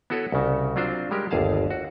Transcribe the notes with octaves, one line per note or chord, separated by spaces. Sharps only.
B3 E4 F#4 A4 B4 C#5
C2 C#3
F#3 C4 D4 F4 C5
G3 G#3 G4 A#4
G1 D#2 G#4 F5 A5
F#4